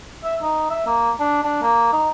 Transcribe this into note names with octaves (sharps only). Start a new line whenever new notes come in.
E5
D#4
E5
A#3
D4
D4
A#3
D#4